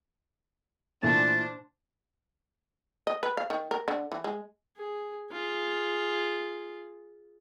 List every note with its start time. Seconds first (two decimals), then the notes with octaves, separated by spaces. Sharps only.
1.03 A#2 E3 A3 D4 C5 A5
3.07 D#5
3.23 B4
3.37 F5
3.50 D#3
3.71 A#4
3.88 D3
4.12 E3
4.24 G#3
4.77 G#4
5.31 F4 G#4